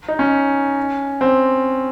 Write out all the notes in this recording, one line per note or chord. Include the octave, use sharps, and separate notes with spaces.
D#4
C#4
C4